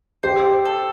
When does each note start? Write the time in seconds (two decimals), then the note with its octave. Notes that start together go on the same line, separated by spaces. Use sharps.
0.23 G4 C5
0.65 A4